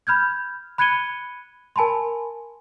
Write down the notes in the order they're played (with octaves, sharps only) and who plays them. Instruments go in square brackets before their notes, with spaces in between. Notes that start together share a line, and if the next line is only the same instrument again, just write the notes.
[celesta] B5 F6 G6 G#6
B5 F#6 G#6 C#7 D#7 G7
A#4 G#5 A5 B5 C6